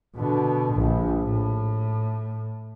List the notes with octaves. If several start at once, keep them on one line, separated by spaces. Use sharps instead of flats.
B2 D3
A#1
A2